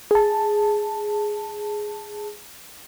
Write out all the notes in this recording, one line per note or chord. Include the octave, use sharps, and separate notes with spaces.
G#4 A5